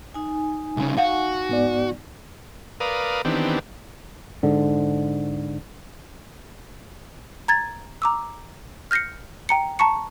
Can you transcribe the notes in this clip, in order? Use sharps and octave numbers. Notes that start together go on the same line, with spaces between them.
D#4 G#5
C2 C#3
F#4 F5 F#5
G#2 B3 D5
A#4 B4 D5 F5 D#6
D#3 E3 B3 C4 D4 G4
G#2 D3
A#5 G#6 A6
A#5 D6 E6
F6 G6 A#6 C7 C#7
G5 A#5 C#7
A5 A#5 C#6 C#7